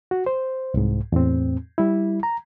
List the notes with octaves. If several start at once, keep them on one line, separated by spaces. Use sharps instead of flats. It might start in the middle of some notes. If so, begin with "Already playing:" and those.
F#4
C5
C2 G#2
E2 A2 C4
G3 E4
A#5